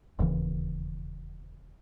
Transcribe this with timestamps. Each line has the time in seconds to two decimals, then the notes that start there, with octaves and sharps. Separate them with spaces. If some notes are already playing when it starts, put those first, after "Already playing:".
0.19 E1 D#2 C#3 E3